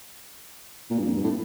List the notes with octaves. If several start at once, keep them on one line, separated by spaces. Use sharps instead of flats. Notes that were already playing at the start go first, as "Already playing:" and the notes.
A#2
G2
F2
G2
A2